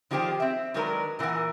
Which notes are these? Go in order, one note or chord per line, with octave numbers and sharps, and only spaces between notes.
D#3 F3 G3 G4 G#4 C5
C4 E5
D#3 F#3 G#3 D4 A#4 B4
A#2 E3 A#4 F#5 G#5